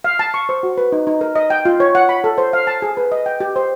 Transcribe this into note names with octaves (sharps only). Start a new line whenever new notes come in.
F5
A5
C#6
C5
F#4
B4
D#4
D#4
A#4
D#5
G5
F4
C#5
F#5
B5
A4
C5
F5
A5
G#4
B4
D#5
G5
G4
C5